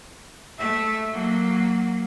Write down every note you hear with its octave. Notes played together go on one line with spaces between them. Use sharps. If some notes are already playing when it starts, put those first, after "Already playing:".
A3 E5
F#3 A#3